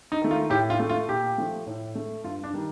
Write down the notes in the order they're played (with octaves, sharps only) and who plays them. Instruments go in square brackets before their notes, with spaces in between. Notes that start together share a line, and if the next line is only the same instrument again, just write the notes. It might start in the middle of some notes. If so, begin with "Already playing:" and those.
[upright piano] D#4
D#3 A3
F4
A2 G4
F4
A3
F4
A#2 G4
F3 A3
A2
A3
G2 F4
D4
D#3 G3